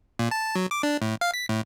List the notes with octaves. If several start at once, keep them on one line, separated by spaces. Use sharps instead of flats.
A#2
A5
F#3
D6
D4
A2
F5
B6
A2